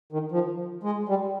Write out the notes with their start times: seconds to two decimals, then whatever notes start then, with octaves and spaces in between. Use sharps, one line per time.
0.12 D#3
0.31 F3
0.83 G#3
1.09 G3